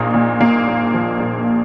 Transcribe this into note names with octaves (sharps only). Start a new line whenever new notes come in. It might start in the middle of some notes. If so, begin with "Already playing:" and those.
Already playing: A#1 A#2 A#3 D#4
A#2
A#2 A#3
A#1
F3
A#1